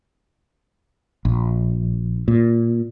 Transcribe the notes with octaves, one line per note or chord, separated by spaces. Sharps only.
A#1
A#2